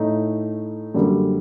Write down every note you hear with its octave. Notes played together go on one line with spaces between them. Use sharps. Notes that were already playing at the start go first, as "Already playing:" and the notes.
Already playing: A2 A3 D#4
F#2 D3 G3 A#3